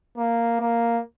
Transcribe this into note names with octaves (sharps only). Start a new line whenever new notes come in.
A#3
A#3